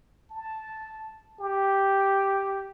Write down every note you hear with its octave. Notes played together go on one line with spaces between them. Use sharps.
A5
G4